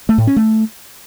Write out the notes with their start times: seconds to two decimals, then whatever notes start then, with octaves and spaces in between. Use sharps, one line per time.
0.09 A3
0.18 A2
0.27 C#4
0.36 A3